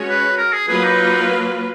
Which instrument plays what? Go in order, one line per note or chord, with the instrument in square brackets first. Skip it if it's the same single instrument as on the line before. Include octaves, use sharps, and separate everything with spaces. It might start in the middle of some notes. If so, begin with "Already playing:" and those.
Already playing: [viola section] G#3 C#4 F#4 C#5
[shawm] B4
A#4
G#4
[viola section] F#3 A#3 F4 B4 [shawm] G#4
[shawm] D#4